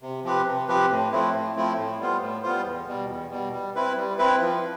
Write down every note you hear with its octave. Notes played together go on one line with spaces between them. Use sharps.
C3
F3 C4 G4 B4
C3
F3 C4 G4 B4
A2
F3 A3 C4 E4
A2
F3 A3 C4 E4
A2
G3 B3 F4 C5
A2
G3 B3 F4 C5
E2
B2 G3
E2
B2 G3
G3
C4 E4 B4
G3
C4 E4 B4
F3